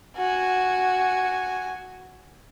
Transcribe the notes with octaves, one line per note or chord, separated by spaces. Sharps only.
F#4 G#5